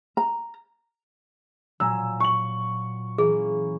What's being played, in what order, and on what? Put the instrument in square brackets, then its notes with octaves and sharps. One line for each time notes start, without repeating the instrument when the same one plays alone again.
[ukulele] A#5
[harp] A#2 F#3 [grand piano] G#5 A#5 E6
[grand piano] C#6 F#7
[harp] E3 A#3 C#4 [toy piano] G#4